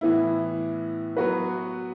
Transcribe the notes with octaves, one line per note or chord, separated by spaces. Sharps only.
A2 E3 B3 E4
F#3 B3 F#4 B4